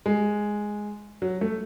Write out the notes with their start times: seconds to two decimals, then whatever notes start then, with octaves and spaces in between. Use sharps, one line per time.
0.06 G#3
1.22 F#3
1.41 A3